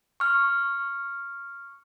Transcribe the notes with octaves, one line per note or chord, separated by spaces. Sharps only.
C#6 F6